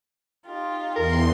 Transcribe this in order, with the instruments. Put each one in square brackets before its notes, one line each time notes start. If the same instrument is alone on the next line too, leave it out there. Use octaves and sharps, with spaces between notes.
[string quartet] D#4 F4 G4
[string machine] E2 C6 [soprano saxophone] A#4